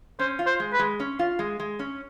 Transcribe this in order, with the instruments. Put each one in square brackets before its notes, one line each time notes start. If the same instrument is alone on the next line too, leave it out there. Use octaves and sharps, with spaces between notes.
[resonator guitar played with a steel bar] C#4 [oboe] C5
[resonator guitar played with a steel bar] F4
[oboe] C5
[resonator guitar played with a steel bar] G#3
[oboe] B4
[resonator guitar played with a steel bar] G#3
C#4
F4
G#3
G#3
C#4